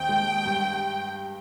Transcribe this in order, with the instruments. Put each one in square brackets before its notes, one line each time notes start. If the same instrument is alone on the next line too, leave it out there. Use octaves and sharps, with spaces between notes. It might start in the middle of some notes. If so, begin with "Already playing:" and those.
Already playing: [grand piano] D#2 D#3 C4 [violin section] G5
[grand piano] G#3
G2